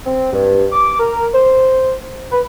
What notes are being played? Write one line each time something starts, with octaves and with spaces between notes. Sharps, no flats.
C4
G2
D6
A#4
C5
B4